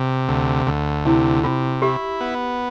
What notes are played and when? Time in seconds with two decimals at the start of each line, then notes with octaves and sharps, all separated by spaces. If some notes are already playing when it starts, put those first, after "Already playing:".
Already playing: C3
0.28 D2
0.67 D2
1.05 C3 E4
1.44 C3 F4
1.82 E4 G4
2.20 B3